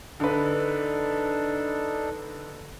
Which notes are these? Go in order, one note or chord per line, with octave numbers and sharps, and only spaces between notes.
D3 D4 D#4 A4 B4